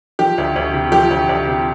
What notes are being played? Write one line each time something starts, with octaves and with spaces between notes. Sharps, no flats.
F3 G4
D2
D2
C3
F3 G4
D2
D2
C3